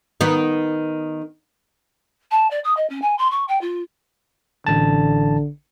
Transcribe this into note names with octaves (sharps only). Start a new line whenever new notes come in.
D#3 B3
A5
D5
D#6
D#5
C#4
G#5
C6
C#6
G5
F4
A1 D3 A5